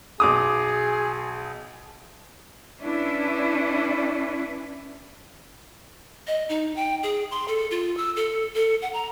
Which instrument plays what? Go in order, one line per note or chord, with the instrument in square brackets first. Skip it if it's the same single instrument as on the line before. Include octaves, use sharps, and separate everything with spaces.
[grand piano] B1 D6 D#6 [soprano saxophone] G#4
[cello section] C#4 D4 E4 B4
[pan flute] D#5
D#4
G5
G#4
C6
A4
F4
E6
A4
A4
F#5
A#5